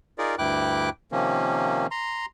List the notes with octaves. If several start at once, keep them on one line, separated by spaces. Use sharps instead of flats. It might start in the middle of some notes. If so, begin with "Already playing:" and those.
D#4 F4 G#4 A#4 D5
D2 G2 E4 G5 D6 F#6
C3 D#3 F3 A#3 C#4
A#5 C6